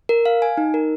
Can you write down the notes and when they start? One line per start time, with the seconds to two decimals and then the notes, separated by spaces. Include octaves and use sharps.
0.09 A#4
0.26 F5
0.42 G#5
0.57 D#4
0.74 A#4